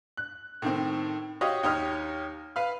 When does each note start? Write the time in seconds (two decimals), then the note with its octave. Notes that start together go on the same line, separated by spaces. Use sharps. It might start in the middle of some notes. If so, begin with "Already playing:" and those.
0.17 F#6
0.62 A2 D#3 C4
1.41 F#4 G4 C#5 D#5 F5 D#6
1.63 D#2 D#4 G4 C#5 D#6 F6
2.56 B4 F5 B5 F6